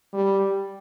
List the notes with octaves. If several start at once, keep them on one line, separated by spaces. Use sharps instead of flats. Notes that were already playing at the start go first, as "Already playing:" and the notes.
G3